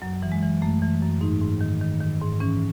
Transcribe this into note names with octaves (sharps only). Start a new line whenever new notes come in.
F#2 F#3
E3
G#3
E3
F#2 A3
E3
F#2
G#2 D#4
G#2
D#3
D#3
D#3
G#2
E3 C#4